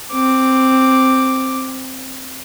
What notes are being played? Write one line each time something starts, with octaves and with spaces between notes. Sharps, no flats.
C4 D6